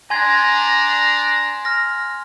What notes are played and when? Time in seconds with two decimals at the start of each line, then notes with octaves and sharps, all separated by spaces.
0.10 D4 G#5 A#5 C6 G#6
1.65 F6 A#6